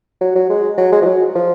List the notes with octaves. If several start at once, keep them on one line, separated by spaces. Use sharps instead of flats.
F#3
F#3
G#3
F#3
G#3
F3
F#3
F3